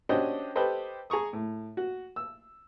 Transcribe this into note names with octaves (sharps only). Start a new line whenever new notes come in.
C#4 D4 F#4 G4 C5 D#5
G4 A4 B4 C5 D#5
G#4 A#5 C#6 D#6
A2
F#4
E6